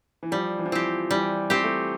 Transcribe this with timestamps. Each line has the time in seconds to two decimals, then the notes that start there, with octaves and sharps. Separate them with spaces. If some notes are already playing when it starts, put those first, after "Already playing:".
0.23 E3
0.32 F3 G3
0.59 E3
0.66 F3
0.72 E3 C4 G4
1.11 E3 G3
1.50 C4 G4
1.64 A3